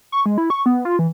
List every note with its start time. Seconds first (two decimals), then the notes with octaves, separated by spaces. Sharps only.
0.12 C#6
0.26 G#3
0.38 E4
0.50 C#6
0.66 B3
0.85 F4
0.99 E3